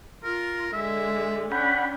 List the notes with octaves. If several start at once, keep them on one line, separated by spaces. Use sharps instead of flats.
F4 A#4
D3 G#3 E5
C#4 D4 F#5 G5 B5